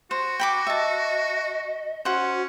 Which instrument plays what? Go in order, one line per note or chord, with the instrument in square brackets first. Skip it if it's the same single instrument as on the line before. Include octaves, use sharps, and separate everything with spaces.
[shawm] F#4 [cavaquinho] C5
[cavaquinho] G5 B5 D6
[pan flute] D#5 [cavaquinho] E5 A5
[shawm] C#4 [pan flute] F#4 [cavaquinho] C5 F#5